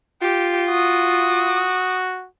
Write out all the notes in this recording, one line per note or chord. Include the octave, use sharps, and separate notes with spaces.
F4 G4
F#4 D#6